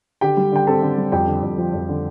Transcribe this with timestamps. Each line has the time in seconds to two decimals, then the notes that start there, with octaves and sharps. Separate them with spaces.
0.21 D3 G4 G5
0.37 G3
0.52 D3 G5
0.67 C4 A4 A5
0.82 D3
0.97 G3
1.12 F2 G4 G5
1.27 D3
1.43 F2
1.58 F3
1.74 F2
1.89 D3